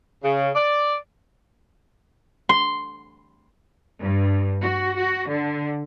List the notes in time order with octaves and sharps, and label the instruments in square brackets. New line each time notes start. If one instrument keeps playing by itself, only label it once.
[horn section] C#3
D5
[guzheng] C6
[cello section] G2
F#4
F#4
D3